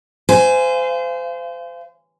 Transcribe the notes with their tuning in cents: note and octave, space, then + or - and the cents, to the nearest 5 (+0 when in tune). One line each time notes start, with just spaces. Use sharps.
C5 -30 F5 -30 G#5 +0